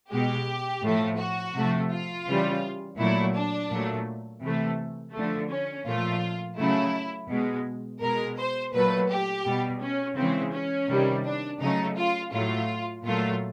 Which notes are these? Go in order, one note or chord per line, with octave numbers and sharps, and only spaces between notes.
B2 G#3 G4
A2 F3 A3
F#4
C3 F3 A3
F4
C#3 E3 G3
A#2 F#3 A3 E4
D4
A#2 F#3 A3
C3 E3 A3
D3 F3 A3
C#4
A#2 F3 A3 F4
C#3 F#3 A3 E4
B2 G#3
B2 G#3 A#4
C5
A#2 F#3 A3 B4
G4
B2 G3
C#4
C#3 E3 G#3 C4
C#4
C3 D#3 G3
D4
C#3 F#3 A3 D#4
F4
A2 F#3 A3 F4
A#2 F#3 A3 F4